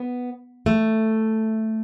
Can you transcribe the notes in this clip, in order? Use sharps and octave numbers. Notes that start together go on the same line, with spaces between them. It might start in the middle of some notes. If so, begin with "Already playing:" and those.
Already playing: B3
A3